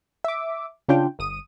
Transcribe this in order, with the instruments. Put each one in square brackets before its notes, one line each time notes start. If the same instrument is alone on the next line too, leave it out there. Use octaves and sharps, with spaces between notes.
[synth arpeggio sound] E5 D6
C#3 C#4 D4 F4 G5
G1 D#6 D#7